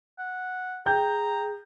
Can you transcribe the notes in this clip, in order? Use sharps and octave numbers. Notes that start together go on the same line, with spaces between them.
F#5
G#4 G5 A#5 G6